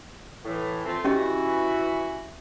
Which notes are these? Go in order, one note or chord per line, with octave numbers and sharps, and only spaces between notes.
A2 E3
A3 C4 F4
E3 C#4 F#4 G4 D#5